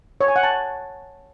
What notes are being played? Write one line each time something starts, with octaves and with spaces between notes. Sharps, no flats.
C#5
G#5
F#5
A5